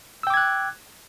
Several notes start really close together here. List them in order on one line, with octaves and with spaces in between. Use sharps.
E6 G5 D6 G#6 F#6